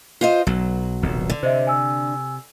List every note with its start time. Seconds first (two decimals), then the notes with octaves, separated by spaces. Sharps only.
0.21 F4 C5 D#5
0.47 B1 F#3
1.02 D#1 B1 C3
1.30 D3
1.43 C3 C5 D#5 E5
1.67 G#5 E6